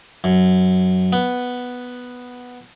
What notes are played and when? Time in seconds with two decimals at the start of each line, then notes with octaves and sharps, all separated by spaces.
0.24 F#2
1.13 B3